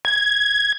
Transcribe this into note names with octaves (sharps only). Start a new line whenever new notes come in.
G#6